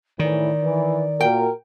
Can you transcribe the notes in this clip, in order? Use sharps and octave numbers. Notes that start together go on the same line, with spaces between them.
A2 D#3 E3 D5
E3
A#2 F#4 A#4 G5